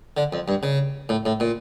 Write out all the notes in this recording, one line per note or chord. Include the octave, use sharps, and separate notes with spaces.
D3
F2
G2
C#3
A2
A2
A#2